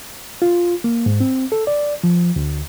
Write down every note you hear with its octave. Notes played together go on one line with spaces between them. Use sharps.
F4
A#3
G#2
C4
A4
D5
F3
D2